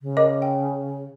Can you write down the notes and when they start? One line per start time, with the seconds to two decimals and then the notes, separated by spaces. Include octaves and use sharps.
0.02 C#3
0.17 A#4 D#5 D6
0.42 G5